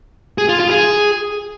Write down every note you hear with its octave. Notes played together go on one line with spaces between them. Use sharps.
G#4
F4
F4
G#4